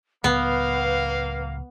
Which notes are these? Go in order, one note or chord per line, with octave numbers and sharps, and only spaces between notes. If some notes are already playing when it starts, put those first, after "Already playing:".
C#2 A2 F#3 A#3 B3 B4 F5